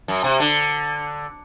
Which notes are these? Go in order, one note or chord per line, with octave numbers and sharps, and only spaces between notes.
F#2
C3
D3